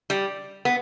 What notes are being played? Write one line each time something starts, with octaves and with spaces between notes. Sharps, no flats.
G3
B3